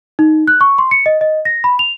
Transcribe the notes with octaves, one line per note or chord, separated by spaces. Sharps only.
D#4
F#6
C#6
C6
C#7
D#5
D#5
A#6
B5
F7